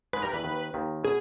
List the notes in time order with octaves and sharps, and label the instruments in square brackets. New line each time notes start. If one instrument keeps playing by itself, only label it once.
[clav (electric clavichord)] G#2 G#3 [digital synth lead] B4
[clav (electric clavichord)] G2 G3 [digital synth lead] A#4
[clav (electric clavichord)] E2 E3 [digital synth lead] B4
[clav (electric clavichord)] D#2 D#3
D#2 D#3
[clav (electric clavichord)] B2 [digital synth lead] G#4